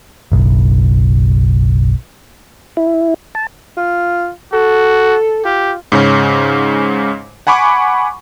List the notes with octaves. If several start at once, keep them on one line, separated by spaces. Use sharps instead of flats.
F#1 B1
E4
A5
F4
F#4 A4
F4 G4
G#2 C#3 C#4
F#5 G#5 B5 C#6 D6